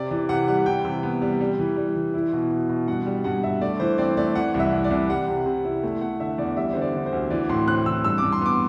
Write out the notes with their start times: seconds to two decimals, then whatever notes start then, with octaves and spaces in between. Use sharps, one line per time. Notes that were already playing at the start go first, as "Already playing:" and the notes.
Already playing: C3 D5
0.11 E3 D5
0.29 C3 F#5
0.48 G3 F#5
0.66 E3 G5
0.85 C3
1.03 B3
1.22 G3
1.40 G3
1.59 E3
1.77 G3
1.96 E3
2.14 E4
2.33 B2
2.51 B2
2.69 B2
2.88 G2 F#5
3.06 G3
3.24 G2 F#5
3.43 G2 E5
3.61 A3 D5
3.80 E3 C5
3.98 C4 D5
4.17 A3 D5
4.35 E3 F#5
4.54 C2
4.60 E5
4.73 C2
4.84 D5
4.91 C2
5.09 G3 F#5
5.28 C3
5.46 C3
5.65 E4
5.83 A3
6.01 A3 F#5
6.20 D3 E5
6.38 E2 D5
6.57 G3 E5
6.73 D3 C5
6.82 D5
6.94 D3
7.06 C5
7.12 D2
7.30 E3 D5
7.49 A2 C6
7.68 C4 F#6
7.86 E3 E6
8.04 G2 E6
8.18 G2 D6
8.32 C6
8.41 B3 D6